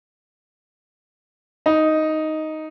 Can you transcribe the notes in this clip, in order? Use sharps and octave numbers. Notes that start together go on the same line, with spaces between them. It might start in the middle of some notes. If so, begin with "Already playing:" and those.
D#4